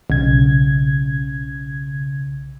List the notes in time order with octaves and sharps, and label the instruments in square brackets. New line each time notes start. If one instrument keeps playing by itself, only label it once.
[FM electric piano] B1 C#3 G#6